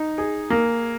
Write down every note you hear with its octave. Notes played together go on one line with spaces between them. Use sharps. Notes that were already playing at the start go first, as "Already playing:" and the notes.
Already playing: D#4
G#4
A#3